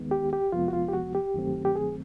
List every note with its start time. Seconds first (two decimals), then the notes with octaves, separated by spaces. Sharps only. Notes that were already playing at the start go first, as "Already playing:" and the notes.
Already playing: D#2 D#3 G#3 B3
0.11 G4
0.33 G4
0.52 F2 C3 F3 G#3 B3 F4
0.68 F#4
0.73 F4
0.89 G4
0.93 F#4
1.15 G4
1.34 G2 D#3 F#3 A3 C4
1.65 G4
1.76 G#4